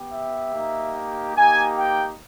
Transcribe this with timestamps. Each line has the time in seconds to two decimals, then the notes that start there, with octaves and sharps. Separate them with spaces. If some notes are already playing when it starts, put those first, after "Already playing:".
Already playing: B3 G4
0.12 E5
0.54 A#3 D#4 G4
1.35 A#3 D#4 G4 G#5
1.78 G5